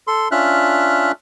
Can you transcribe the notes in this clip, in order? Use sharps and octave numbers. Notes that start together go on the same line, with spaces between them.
A4 C6
C#4 D4 F4 E5 F6 F#6